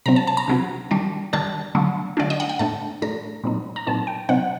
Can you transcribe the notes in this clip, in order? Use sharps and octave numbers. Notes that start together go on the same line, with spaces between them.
C3 F#3 C4 A#5
A5
A5
A#5
C3 F#3 C4
D#3 G3 D4
D#3 G3 D4 A5
D3 F#3 A3 D4
D3 F#3 A3 D4 D5
D#5
F#5
G5
A2 A3 D4 A5
A2 A3 D4 A#5
A#2 F#3 C4 D#4
A#5
A#2 F#3 C4 D#4 A5
G5
C3 F#3 C4 D#4 F#5